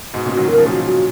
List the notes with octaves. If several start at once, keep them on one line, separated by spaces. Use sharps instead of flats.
G#2 B2 F#4
A#2 C#3
F#4
D#3 F#3
A#4
C#3 F3
A#2 F#4
F#4